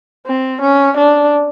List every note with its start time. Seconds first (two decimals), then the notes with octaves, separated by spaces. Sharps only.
0.27 C4
0.61 C#4
0.97 D4